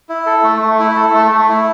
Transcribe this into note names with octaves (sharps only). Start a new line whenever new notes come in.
E4
A4
A3
A3
E4
A4
A3
A3
E4